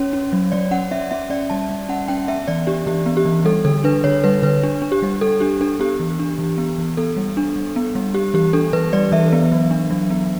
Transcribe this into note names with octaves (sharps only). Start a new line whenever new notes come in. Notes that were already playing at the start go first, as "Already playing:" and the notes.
Already playing: C#4 C#5
C#4
F#3
F#3 D5
C#4 F#5
C#4 E5
C#4 E5
C#4 D5
G3 A5
G3
C#4 F#5
C#4 G5
B3 E5
E3 D5
D4 G4
E3 G4
B3
G4
E3
G3 A4
D3 A4
D4 B4
D3 C#5
G3 B4
D3 B4
D4
D4
G4
G3
G3 A4
D4 G4
D4 A4
B3 G4
E3
D4
E3
B3
E3
B3 A4
G3
D4
G3
B3
G3
G3 G4
E3 G4
D4 A4
E3 B4
G3 D5
E3 E5
B3
F#3
D4
F#3
B3